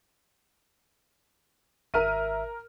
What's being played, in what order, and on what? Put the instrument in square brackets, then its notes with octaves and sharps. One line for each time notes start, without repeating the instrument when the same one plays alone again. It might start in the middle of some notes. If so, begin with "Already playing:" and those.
[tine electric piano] G#1 E5 [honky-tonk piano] A#4 F6 D#7